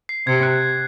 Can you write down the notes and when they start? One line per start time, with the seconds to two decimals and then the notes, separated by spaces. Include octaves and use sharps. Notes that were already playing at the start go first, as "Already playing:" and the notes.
0.09 C7
0.27 C3 G#6
0.43 F#6